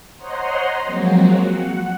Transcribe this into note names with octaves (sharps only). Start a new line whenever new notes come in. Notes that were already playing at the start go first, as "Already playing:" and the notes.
C5 C#5 D#5 F#5 A#5 C6
F3 F#3 G#3 A#3 C4 F#4
F#5